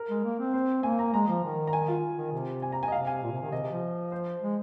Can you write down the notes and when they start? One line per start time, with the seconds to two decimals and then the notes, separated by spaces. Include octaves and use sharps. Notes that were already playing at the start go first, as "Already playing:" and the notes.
Already playing: A#4
0.09 G#3
0.24 A#3
0.39 C4
0.53 C5
0.83 A#3 G#5
0.99 A#5
1.13 G#3 A#5
1.28 F3
1.44 D#3
1.67 A#5
1.73 G#5
1.88 F4
2.17 D#3
2.33 C3
2.62 G#5
2.72 A#5
2.83 G#5
2.88 D#5
2.92 C3 F5
3.07 G#5
3.23 A#2
3.32 C3
3.42 D#3
3.52 C3 D#5
3.62 C3
3.71 F3
4.12 C5
4.42 G#3